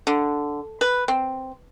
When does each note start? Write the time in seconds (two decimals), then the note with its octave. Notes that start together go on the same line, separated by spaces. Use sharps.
0.07 D3
0.81 B4
1.08 C4